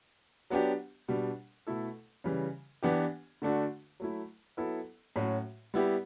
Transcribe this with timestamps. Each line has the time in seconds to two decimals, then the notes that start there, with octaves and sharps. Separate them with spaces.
0.50 F#3 B3 D4 G4
1.08 B2 G3 D4
1.67 B2 A3 E4 A4
2.24 C#3 E3 G3
2.83 E3 B3 D4 G4
3.42 D3 A3 D4 F#4
4.00 F#3 A3 E4
4.57 F#3 B3 E4 A4
5.16 A2 F#3 C#4 F#4
5.74 G3 B3 E4 G4